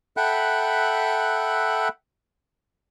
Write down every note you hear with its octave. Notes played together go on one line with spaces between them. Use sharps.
A4 E5 F#5 G5 B5 F#6